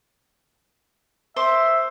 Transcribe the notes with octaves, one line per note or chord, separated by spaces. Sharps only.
C5 E5 C6 D6